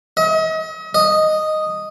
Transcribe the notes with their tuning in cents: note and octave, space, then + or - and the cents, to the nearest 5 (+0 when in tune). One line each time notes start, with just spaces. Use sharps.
D#5 +40
D#5 -5